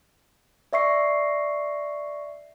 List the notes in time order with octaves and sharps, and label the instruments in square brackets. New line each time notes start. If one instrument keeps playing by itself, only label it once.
[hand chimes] D5 E5 C#6 C7